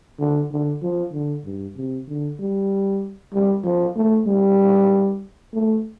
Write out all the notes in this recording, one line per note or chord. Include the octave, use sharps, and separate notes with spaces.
D3
D3
F3
D3
G2
C3
D3
G3
G3
F3
A3
G3
A3